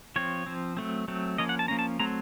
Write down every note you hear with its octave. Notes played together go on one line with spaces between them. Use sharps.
F3 C4 C#5
F3 C4
F#3 A3 C4
F#3 A3 C4
F3 A#3 C#4 D#5
F#5
A5
F3 A#3 C#4 A#5
A5
F#3 A3 C4 A#5